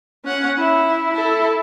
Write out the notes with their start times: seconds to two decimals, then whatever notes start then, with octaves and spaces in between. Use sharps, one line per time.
0.25 C#4 F#5
0.58 E4
1.14 E4 A4